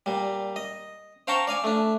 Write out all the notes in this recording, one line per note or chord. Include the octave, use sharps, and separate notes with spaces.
A#2 G3
D#5
C5 F5 G5 A5 A#5 C#6
D5 F5 G#5
A3 D4